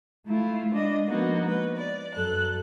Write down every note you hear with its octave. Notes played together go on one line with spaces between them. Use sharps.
A3 E4 F4
G#3 D4 D#5
F3 G#3 A#3 B3 D#4 F#4
B4
D5
F#2 A4 F#6